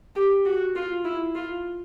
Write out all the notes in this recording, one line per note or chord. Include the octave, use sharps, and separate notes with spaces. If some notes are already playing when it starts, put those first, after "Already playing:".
G4
F#4
F4
E4
F4